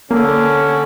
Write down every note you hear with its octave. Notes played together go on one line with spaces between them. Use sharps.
D3 A#3 C#4